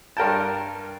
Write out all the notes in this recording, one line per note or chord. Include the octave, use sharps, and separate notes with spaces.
G2 A#4 G5 A5